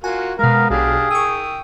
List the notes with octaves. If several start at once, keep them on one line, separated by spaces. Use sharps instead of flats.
F4 F#4 A#4 G#5
B2 G#3 B3 A#4 F5
B1 B2 D4 G4 G#4 F5
G5 C#6 D#6 E6